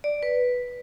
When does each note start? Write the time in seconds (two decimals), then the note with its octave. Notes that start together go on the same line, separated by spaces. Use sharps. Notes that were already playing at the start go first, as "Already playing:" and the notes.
0.04 D5
0.23 B4